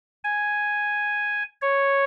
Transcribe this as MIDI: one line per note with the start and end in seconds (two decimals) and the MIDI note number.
0.24 1.43 80
1.62 2.04 73